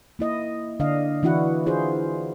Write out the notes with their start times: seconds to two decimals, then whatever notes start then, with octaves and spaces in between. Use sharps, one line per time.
0.19 A#3 E4 D#5
0.80 D3 D4 D#5 F5
1.23 E3 D4 E4 F#4 F#5
1.66 E4 F4 G#4 C5